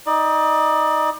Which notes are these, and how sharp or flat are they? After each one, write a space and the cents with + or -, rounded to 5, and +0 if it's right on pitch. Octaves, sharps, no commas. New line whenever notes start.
D#4 +25 D5 +35